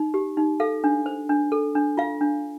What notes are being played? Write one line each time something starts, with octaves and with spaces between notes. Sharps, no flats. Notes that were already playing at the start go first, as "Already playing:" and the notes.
Already playing: D#4
G4
D#4
A4 F5
D4
C5
D4
A4
D4
F4 F5
D4